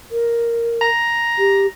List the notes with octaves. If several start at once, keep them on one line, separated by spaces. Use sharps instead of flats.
A#4
A#5
G4